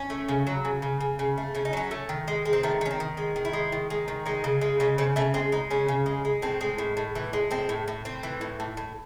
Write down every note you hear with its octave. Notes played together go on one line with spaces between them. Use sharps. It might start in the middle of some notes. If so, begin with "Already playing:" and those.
Already playing: C#4
A3
C#3
F#3
C#3
C#3
C#3
C#3
A3
C#3 C#4
D#4
F#3 C#4
A3
D#3
G#3
G#3
C4
D#3 A3
D#3 C#4
C4
D#3
G#3
D#3
E4
G#3
D#3
G#3
D#3
G#3 D#4
C#3
G#3
C#3 C#4
C#3 C4
C#3 A3
G#3 C4
G#3 D#4
C#3 C#4
C#3
G#3
G#3
A2 C4
G#3
A2
A2
E3
G#3
A2 C4
A2
A2
A2 C4
E3
A2
A2
A2